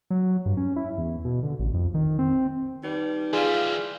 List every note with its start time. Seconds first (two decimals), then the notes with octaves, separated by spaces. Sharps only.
0.10 F#3
0.46 G2
0.57 C#4
0.76 E4
0.98 E2
1.25 B2
1.43 D3
1.59 A1
1.74 F2
1.94 D#3
2.19 C4
2.83 G3 D#4 B4
3.33 E3 G3 F4 G#4 D5 F5